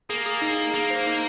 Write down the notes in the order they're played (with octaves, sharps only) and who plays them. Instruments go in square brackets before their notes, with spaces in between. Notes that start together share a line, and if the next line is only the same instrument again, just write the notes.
[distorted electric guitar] A#3 [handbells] G#4
[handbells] G#4
D#4
D#4
[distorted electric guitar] A#3 [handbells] D#4
[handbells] C5
D#4